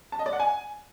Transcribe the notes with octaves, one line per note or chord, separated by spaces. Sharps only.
A5
D#5
D5
F#5
G#5